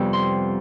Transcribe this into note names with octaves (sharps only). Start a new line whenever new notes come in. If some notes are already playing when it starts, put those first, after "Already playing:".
Already playing: F2 C3 G3 B3
C6